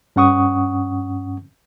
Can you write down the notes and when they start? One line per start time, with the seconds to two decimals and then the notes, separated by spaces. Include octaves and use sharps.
0.16 G2 C#4 F#5 C#6 D#6